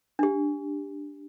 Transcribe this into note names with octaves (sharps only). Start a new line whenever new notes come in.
D4 G4